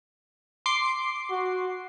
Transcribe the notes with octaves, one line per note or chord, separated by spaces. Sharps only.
C6 D6 C7
F#4